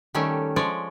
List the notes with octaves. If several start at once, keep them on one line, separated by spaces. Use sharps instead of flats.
D#3 G3 A3 C#4
F3 G#3 C#5 D5